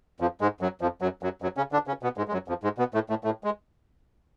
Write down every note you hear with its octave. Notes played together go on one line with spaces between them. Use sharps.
F2 F3
G#2 G#3
F#2 F#3
F2 F3
F#2 F#3
F#2 F#3
F#2 F#3
C#3 C#4
D3 D4
C#3 C#4
B2 B3
G#2 G#3
G#3
F#2 F#3
F2 F3
G#2 G#3
B2 B3
A2 A3
A2 A3
A2 A3
G#3